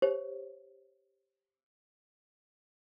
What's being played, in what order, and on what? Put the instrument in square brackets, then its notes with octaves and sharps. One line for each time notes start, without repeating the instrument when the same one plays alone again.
[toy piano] G4 C5 C#5